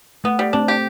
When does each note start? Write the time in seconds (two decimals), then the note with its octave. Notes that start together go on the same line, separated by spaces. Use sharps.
0.24 A3 B3
0.39 G3
0.53 A3 C4 D4
0.68 G4